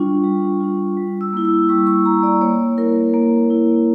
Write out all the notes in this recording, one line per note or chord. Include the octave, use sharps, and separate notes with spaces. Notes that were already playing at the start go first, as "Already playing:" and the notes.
Already playing: G3 D4 F4 C#6
G3
D4 F4
G3
E6
A#3 E4
E6
G3 C#6
C#6
A#3 E4 A#5
D5
A#3 C#5
E4 A#4
A#3
E4